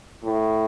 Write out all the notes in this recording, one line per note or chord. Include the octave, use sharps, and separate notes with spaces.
A2